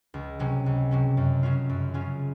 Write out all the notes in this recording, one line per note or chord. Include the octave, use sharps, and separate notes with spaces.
C#2
C3 F#3 C#4
C#2
C3 F#3 C#4
F#2
C#3 F#3 C#4 F4
F#2
C#3 F#3 C#4 F4